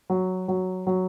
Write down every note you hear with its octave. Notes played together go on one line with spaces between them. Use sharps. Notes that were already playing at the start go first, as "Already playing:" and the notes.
F#3
F#3
F#3